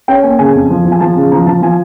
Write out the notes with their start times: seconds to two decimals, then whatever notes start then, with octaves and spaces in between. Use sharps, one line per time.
0.08 C#4 G5
0.23 A#3 G#5
0.39 C#3 G#5
0.54 F2
0.70 F3
0.85 F3
0.92 G#5
1.00 F3 A5
1.16 C#3
1.32 F3 A#5
1.46 F3 A5
1.62 F3 G#5